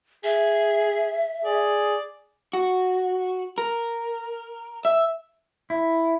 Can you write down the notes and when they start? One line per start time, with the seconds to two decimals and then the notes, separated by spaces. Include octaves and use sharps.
0.24 G#4 E5
1.45 G#4 D5
2.53 F#4
3.58 A#4
4.85 E5
5.70 E4